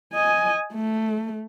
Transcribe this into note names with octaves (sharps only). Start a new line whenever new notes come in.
D#5 G#5
A3